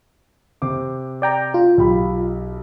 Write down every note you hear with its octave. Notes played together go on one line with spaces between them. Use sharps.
C3 C5 D6
D5 G5 A#5
F4
B1 G4 B5